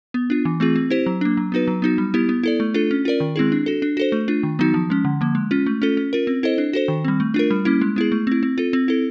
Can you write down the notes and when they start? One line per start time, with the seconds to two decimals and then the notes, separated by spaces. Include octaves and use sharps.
0.14 B3
0.30 D4 F4
0.45 E3
0.60 A3 C4 F4 G#4
0.76 C4
0.90 E4 G4 C5
1.06 F#3
1.21 A#3 D4
1.37 F#3
1.52 B3 D#4 F#4 B4
1.68 F#3
1.82 B3 D#4 F#4
1.98 G3
2.14 B3 E4 G4
2.29 B3
2.43 E4 A4 D5
2.60 A3
2.74 D4 F4 A4
2.91 C#4
3.05 F4 A#4 D5
3.20 D#3
3.36 G#3 C4 E4 G#4
3.52 D4
3.66 F#4 A4
3.82 D4
3.97 F#4 A4 C5
4.12 A3
4.28 D4 F4
4.43 D#3
4.59 F#3 B3 D#4 F#4
4.74 F3
4.90 G#3 C#4
5.05 D3
5.21 F3 A#3
5.35 G#3
5.51 C#4 F4
5.66 A3
5.82 C#4 F4 A4
5.97 C#4
6.13 F4 A#4
6.27 C4
6.43 E4 A4 C5 D#5
6.58 D4
6.73 F#4 A4 C5
6.88 D#3
7.04 G3 C4
7.20 A3
7.34 D4 F4 A#4
7.51 G3
7.65 A#3 C#4 E4
7.81 G#3
7.96 B3 E4 G#4
8.12 A3
8.27 C4 E4
8.43 C4
8.58 F4 A4
8.73 C4
8.88 E4 A4